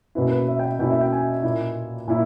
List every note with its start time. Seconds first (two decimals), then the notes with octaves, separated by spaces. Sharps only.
0.15 B2 A#3 C#4 E4 B4
0.32 B4
0.48 E5
0.59 G5
0.63 E5
0.79 B2 A#3 C#4 E4 G5
0.91 E5
1.01 G5
1.12 G#5
1.43 A#2 A#3 E4
2.08 A#2 A#3 E4